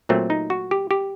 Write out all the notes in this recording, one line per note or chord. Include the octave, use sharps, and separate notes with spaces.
A#2 F#3 A3 C4
D#4
F#4
G4
G4